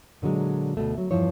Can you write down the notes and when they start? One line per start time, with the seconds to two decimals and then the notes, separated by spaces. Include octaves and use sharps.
0.22 A#2 D3 F#3 G#3
0.77 D2 B2 A3
0.98 F#3
1.11 E2 G2 F3 E4 C#5